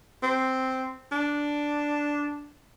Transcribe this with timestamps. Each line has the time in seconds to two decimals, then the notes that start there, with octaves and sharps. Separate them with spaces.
0.23 C4
1.12 D4